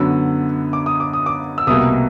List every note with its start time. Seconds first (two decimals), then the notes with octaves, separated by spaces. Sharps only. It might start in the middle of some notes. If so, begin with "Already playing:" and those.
Already playing: F#2 D3 F#3 B3 E6
0.73 D6
0.86 D#6
1.00 D6
1.13 D#6
1.26 D6
1.58 E6
1.67 C2 B2 G3 A#3 D#6